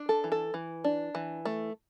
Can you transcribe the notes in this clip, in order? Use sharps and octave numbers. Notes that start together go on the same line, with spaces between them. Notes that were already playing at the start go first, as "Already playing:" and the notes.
Already playing: D4
A4
E3
A4
E3
D4
E3
A3